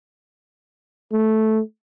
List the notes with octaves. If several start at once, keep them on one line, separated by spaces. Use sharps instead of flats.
A3